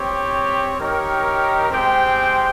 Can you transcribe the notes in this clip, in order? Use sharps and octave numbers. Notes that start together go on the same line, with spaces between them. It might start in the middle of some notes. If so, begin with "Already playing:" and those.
Already playing: C4 G4 C#5
D#4 G4 A#4 C#5 G5
G#3 C4 G4 C5 G5